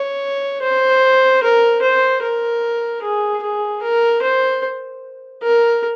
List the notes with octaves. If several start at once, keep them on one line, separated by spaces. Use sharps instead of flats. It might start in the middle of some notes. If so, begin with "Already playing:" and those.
Already playing: C#5
C5
A#4
C5
A#4
G#4
G#4
A#4
C5
A#4